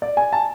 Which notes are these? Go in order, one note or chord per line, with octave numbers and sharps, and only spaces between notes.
D5
G#5
A5